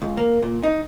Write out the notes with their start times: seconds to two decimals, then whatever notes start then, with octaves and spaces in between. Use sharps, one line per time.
0.02 C#2
0.17 A#3
0.42 A#2
0.63 D#4